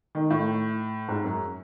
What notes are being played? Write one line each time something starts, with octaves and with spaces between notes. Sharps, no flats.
D#3
A2
G#2
F#2